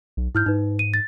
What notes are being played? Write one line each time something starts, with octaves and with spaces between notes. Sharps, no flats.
B1
G#2 E4 F6 G6
G#2 D#4 B4
D#7
A6